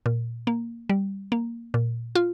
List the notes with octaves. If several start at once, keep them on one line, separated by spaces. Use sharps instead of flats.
A#2
A#3
G3
A#3
A#2
F4